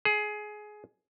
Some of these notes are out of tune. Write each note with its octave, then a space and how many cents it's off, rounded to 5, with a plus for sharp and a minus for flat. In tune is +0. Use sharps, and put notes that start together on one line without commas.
G#4 +20